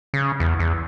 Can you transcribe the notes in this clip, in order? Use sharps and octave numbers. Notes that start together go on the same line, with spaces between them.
C#3
E2
E2